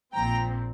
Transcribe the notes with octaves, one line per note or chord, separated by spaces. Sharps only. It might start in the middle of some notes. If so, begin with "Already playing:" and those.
A#1 A#2 F3 C4 G5 A#5